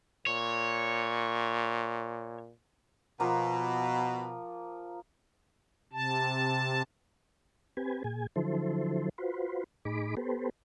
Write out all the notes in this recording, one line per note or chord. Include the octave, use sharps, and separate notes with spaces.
A#2 C#5
B2 F3 A#3 A#5
C3 A5
C4 G4 B4 G#5
A#2 G#4 G#5
D3 F3 F#3 E4 A4 C5
F4 F#4 B4 C5
A2 D#4 G#4 B5 D6
B3 G4 A4 B4 C5